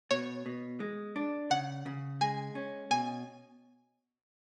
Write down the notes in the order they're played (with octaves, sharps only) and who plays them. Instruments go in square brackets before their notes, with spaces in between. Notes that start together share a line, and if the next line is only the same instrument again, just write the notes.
[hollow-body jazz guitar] B2 [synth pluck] C#5
[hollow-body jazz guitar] B2
G#3
D4
[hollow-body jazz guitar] C#3 [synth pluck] F#5
[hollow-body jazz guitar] C#3
[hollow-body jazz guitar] G#3 [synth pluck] G#5
[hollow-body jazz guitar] C#4
[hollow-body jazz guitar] B2 [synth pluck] G#5